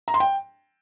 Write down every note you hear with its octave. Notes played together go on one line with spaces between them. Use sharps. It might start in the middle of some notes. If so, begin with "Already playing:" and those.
A#5
C6
G5